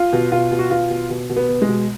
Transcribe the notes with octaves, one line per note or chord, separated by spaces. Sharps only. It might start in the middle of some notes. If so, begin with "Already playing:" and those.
Already playing: F4
B2
B2 F4
B2
F#4
B2 F4
B2
B2
B2
B3
B2
G#3
B2